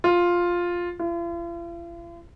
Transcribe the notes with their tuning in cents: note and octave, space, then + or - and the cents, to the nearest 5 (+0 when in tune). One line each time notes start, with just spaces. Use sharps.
F4 +5
F4 -45